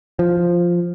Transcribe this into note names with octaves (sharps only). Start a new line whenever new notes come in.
F3